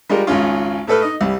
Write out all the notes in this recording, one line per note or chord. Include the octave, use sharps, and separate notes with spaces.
G3 G#3 F4 A#4
G#1 C#2 C#4 F4
A2 A3 A4 B4 F6
D#4 D#5
C2 G3